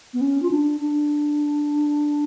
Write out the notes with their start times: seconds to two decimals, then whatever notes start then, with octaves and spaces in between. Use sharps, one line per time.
0.14 B3
0.21 C#4
0.42 F4
0.51 D4
0.80 D4